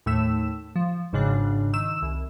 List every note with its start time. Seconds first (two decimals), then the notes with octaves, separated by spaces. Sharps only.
0.06 D#2 A2 A3 E6 B6 E7
0.76 F3
1.13 G#1 G#2 C#3 D4 F#6
1.73 D#3 E6 E7
2.02 C2